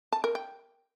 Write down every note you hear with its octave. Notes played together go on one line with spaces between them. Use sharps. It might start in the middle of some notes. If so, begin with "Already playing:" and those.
A5
A#4
G5